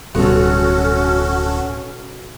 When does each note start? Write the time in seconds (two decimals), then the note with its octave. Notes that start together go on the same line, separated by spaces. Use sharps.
0.15 D1 B1 G3 C#4 F#4 A4